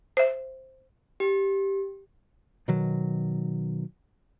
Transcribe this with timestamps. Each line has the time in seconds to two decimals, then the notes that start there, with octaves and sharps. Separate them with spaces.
0.17 C5 E5
1.20 G4
2.68 B2 D#3 F#3